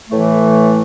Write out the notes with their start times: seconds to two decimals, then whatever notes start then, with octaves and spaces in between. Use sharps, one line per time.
0.08 A2 E3 A3